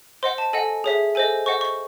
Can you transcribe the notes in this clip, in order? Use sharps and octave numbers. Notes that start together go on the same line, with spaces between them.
C5 D#5 F#5 C6
A5
A4 D#5 F#5 G#5
G#4 C#5 E5
A4 C5 D#5 G#5
C5 D#5 F#5 C#6
C#6